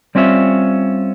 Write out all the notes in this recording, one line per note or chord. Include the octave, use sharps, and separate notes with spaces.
G3 C4 C#4 F4 E5